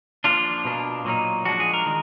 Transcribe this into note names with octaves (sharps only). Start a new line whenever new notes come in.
F3 A#3 D4 F4
B2 A#3 D4
A#2 F#3 A#3 D#4
F3 G#3 D4 F#4
G#4
A#4
D#3 G#3